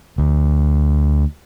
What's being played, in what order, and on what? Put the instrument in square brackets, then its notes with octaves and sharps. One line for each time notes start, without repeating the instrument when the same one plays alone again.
[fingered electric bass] D2